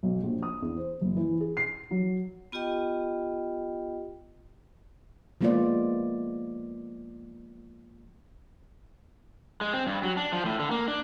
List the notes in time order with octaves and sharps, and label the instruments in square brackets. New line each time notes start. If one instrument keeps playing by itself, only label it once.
[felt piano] B1
A#1
D#6
E2
C5
F#1
E3
G#4
C7
F#3
[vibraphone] B3 F4 G4 D#5 G5
[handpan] F3 G#3 A#3 B3 F4 D5
[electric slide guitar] G#3
C4
G2
F#3
D4
F3
A2
D3
A#3
D4